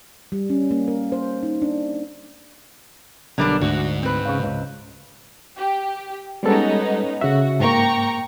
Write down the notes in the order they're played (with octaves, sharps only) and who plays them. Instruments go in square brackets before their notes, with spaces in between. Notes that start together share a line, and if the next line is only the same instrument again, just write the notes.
[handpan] G3
C#4
A#3
A#4
C5
D#4
D4
[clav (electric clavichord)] B1 A#4 [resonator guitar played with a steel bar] D3 G3 D4
[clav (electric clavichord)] D2 [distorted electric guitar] G#2 [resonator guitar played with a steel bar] F#4
[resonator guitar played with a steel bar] C4 B4
[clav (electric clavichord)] C#3 C#5 F5
C#2
[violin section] G4
[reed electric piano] G3 G#3 A4 [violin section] B3 C#4 D#4
[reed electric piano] C#3 E5 [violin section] F#4
[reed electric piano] G#2 A#3 [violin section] G5 A#5 C#6